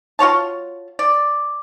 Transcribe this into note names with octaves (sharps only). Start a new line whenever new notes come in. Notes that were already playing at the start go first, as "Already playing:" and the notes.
F4 F#4 C#5 A5
D5